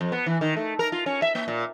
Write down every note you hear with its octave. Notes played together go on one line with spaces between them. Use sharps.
F2
B3
E3
D#3
A3
A#4
F4
C#4
E5
A#3
A#2